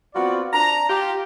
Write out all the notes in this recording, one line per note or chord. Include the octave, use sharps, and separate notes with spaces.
B3 C4 F4 F#4 D5
D4 A#5
F4 G4